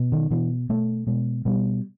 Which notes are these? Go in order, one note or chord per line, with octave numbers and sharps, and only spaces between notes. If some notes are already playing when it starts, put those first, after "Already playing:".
Already playing: B2
D#3
B2 E3
B2 A3
B2 G#3
B2 G3